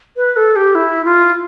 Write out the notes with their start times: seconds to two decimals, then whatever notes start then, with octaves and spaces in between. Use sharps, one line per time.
0.17 B4
0.36 A4
0.56 G4
0.75 E4
1.05 F4